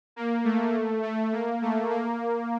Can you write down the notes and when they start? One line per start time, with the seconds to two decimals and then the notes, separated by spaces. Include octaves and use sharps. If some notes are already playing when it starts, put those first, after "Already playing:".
0.16 A#3
0.44 A3
1.03 A3
1.33 A#3
1.62 A3
1.90 A#3